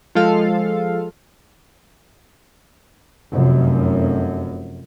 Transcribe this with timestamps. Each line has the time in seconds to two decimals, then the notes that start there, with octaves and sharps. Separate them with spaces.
0.15 F3 G#3 F4 A4 F5
3.32 F1 F#2